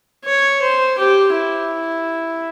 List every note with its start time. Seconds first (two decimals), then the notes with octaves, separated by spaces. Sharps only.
0.25 C#5
0.62 C5
0.98 G4
1.34 E4